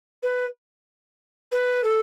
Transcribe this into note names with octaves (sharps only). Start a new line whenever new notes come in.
B4
B4
A4